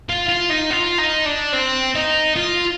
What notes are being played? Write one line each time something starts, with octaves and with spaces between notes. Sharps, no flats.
F4
F4
D#4
F4
D#4
D4
C4
D#4
F4